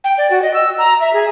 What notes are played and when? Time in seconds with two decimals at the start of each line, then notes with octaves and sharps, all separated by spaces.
0.04 G5
0.18 D5
0.31 F#4
0.42 D#5
0.54 E6
0.78 A#5
1.01 E5
1.13 G#4